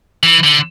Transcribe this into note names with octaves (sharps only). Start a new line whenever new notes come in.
E3
D3